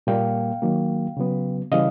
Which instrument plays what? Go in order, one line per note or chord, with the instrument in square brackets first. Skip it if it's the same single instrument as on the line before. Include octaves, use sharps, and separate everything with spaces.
[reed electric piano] A#2 G3 A#3 F5 G5
D#3 F#3 A#3
C#3 F#3 B3
C#3 E3 G3 D#5 F5